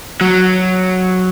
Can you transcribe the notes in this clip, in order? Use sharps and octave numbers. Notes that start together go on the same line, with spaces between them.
F#3